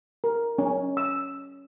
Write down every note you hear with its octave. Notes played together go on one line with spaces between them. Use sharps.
A#4
C#4
E6